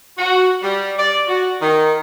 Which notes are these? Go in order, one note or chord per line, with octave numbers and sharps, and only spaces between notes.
F#4
G3
D5
F#4
D#3